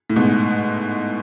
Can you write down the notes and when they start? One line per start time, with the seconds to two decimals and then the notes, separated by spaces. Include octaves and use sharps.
0.10 A2
0.16 G#2 B2